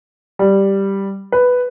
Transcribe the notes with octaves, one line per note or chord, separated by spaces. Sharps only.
G3
B4